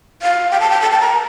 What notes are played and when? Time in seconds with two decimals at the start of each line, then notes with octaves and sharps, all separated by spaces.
0.22 F5
0.51 G5
0.60 A5
0.70 G5
0.81 A5
0.91 A5
1.00 A#5